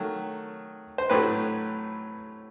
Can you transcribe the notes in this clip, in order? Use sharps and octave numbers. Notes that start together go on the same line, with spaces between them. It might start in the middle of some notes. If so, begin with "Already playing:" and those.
Already playing: D#3 F#3 A3
C5
A2 F#3 A3 G4 B4